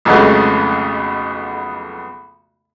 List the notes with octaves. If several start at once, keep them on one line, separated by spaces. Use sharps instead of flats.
B1 F2 C#3 G#3 A3 B3